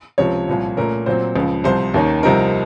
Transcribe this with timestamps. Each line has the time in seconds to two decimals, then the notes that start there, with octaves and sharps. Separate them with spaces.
0.18 C#2 C3 F3 C#5
0.48 C2 A#2 F3
0.77 A#2 A3 C#4 A#4
1.06 A#2 F#3 C4 C5
1.36 C#2 C#3 F3
1.64 C2 C3 F3 C5
1.94 D#2 D#3 A#3 C#4
2.23 C2 C3 F3 C4 D#4 A#4